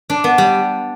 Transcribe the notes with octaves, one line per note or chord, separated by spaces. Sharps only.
D4
B3
G3